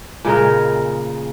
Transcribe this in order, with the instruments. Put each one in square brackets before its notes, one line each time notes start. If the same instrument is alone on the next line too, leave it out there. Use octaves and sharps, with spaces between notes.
[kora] A#2 C#3 G#3 A#4